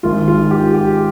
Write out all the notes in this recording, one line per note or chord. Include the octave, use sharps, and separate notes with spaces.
G#1 G#2 D#3 G#3 F4
F4
G4
G4